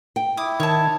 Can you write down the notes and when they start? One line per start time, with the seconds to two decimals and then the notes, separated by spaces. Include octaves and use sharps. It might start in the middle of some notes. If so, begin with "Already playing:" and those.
0.16 G5
0.37 E4 D6 D#6
0.60 D#3 C#5 A5